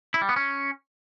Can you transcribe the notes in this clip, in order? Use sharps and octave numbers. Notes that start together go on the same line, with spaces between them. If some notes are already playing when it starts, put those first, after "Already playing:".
E4
G3
B3
C#4